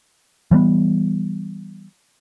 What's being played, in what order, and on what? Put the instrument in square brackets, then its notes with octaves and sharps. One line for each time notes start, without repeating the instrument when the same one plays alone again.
[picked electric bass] E3 G3 A3 B3